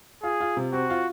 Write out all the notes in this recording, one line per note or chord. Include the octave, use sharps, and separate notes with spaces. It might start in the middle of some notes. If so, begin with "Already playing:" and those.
F4 G#4
F4
C3
C4 F#4
F4